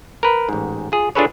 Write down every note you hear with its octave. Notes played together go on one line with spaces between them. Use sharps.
A#4 B4
A1 G#2
F4 G#4
D4 F4 G#4 A4 B4 C#5